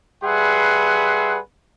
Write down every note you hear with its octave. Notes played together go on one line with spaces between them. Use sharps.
G3 G#4 B4 E5 F#5 C6